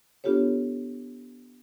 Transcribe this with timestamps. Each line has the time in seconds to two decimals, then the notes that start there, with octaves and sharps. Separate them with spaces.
0.24 B3 D4 F4 G4 A4 C#5